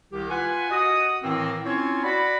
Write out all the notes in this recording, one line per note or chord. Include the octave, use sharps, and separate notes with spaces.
C2 D#3 G4
F4 B4 F#5 G#5
F#4 D#5 D#6
A2 D#3 E3 A#3 C4
C4 C#4 E4 F4 C#5
F#4 D5 B5